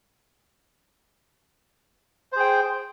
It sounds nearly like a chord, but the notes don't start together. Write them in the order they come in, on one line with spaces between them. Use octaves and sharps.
C5 G#4 G5